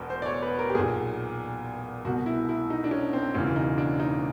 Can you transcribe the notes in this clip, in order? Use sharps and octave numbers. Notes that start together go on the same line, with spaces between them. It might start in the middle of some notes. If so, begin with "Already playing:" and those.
Already playing: E1 E2 B2
C5
D5
C#5
B4
A#4
G4
B1 A#2 G#4
C2 B2 F#4
E4
E4
D#4
D4
C#4
C4
E1 E2 C#3 E3 C#4
D#4
D4
D#4